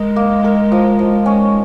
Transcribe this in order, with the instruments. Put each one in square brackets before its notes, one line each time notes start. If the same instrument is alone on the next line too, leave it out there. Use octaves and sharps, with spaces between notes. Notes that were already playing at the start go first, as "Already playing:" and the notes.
Already playing: [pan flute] G#3 [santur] D#4 A#4
[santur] A#3
A#4
F3
F3
C#4